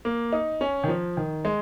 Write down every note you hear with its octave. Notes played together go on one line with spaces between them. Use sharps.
A#3
D#4
C#4
D#3
F3
D#3
G#3